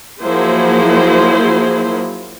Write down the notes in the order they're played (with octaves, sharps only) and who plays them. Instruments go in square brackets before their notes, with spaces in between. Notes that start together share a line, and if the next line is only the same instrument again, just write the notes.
[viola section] F3 F#3 A#3 E4 G#4 C5